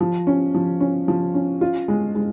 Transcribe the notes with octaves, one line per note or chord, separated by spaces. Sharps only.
F3
C#4
F3
C#4
F3
C#4
F4
G#3
G#3